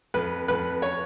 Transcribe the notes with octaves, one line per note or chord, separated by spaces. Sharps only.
F2 B4
F2 B4
C#5